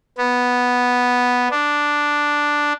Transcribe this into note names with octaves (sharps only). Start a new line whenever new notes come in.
B3
D4